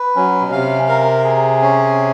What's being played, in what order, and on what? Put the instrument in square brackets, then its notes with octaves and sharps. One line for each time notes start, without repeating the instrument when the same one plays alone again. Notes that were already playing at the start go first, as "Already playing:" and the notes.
Already playing: [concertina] B4
[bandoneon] F#3 [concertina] C#4
[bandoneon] B2
[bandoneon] C3 [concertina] F5
[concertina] A#4
G#4
C#4